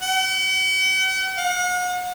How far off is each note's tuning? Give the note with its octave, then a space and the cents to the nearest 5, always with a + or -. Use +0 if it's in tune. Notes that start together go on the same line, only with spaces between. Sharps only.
F#5 +45
F#5 -40